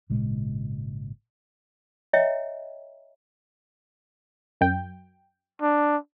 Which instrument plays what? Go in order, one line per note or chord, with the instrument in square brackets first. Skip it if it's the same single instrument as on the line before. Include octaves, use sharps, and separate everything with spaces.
[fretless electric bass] G#1 A#2 C#3 G#3
[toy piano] C#5 D#5 E5 G5 A#5
[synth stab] F#2 G5
[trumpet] D4